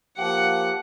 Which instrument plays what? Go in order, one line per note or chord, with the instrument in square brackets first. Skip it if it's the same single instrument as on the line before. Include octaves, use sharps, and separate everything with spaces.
[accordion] F3 A#3 G4 [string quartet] F#5